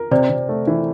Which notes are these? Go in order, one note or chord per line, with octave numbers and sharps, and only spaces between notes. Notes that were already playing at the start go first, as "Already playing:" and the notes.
Already playing: A#4
C3 C5 D5
C3
A3
E3